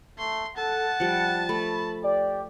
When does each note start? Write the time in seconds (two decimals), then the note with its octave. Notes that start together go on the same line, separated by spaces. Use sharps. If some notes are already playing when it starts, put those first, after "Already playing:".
0.19 A3 C6
0.57 A4 F#5 A5
1.00 F3 G3 C#7
1.49 A3 B5
2.04 G4 D5